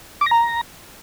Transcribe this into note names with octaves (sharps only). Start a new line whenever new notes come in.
D6
A#6
A#5